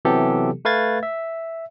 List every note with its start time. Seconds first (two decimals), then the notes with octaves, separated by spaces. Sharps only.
0.05 C3 E3 F#3 B3 G4 A4
0.65 A3 B4 F5 G#6 A6
1.03 E5